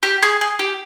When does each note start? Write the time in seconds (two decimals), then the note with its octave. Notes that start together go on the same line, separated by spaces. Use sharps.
0.03 G4
0.23 G#4
0.41 G#4
0.59 G4